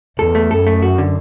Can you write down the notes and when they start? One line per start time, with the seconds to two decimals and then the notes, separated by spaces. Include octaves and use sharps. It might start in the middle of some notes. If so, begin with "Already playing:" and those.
0.18 E2 A4
0.35 A3
0.50 F#2 A4
0.67 A3
0.82 F#4
0.98 D3